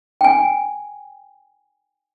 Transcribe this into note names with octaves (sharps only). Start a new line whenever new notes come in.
G5 G#5